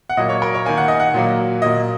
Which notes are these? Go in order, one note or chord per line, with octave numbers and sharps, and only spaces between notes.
F#5
A#2 F#3 A#3 D#5
C#5
A#4
C#5
D#3 A#3 G#5
F#5
D#5
F#5
A#2 F#3 A#3
A#2 F#3 A#3 D#5